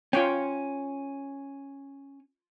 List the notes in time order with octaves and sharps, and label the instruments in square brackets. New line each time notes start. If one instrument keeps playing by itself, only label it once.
[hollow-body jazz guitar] C#4 [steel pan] F4 C#5 G5